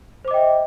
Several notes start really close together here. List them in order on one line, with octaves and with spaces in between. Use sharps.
C5 D6 D#5 G5 E5